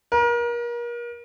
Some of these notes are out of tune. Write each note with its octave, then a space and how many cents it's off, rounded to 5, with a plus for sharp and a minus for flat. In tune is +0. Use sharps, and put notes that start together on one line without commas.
A#4 +35